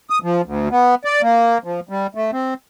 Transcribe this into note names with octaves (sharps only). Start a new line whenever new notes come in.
D#6
F3
D2
B3
D5
A#3
F3
G3
A3
C4